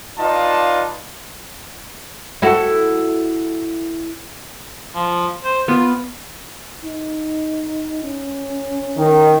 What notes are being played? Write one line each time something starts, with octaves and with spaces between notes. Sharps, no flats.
D#4 F4 B4 D5 F5 A5
E4 F#4 A4
F3
C5
B3 F4
D#4
C#4
D#3